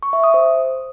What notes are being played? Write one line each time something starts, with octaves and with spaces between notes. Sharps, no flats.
C#6
E5
D#6
C5